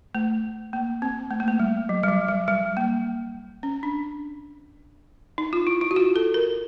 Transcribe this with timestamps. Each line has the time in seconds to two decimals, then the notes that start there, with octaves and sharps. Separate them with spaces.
0.15 A3
0.73 A#3
1.02 C4
1.31 A3
1.40 A#3
1.48 A3
1.59 G3
1.89 F#3
2.03 G3
2.08 F#3
2.28 G3
2.48 G3
2.77 A#3
3.63 C#4
3.83 D4
5.38 D#4
5.53 F4
5.67 E4
5.81 E4
5.91 F#4
5.96 F4
6.16 A4
6.34 A#4